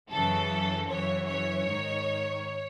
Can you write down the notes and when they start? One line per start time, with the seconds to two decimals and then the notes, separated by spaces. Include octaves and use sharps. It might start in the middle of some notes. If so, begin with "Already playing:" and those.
0.10 F#2 C#3 E3 A4
0.88 F#2 C#3 E3 C#5
1.28 C#5
1.66 G#2 D#3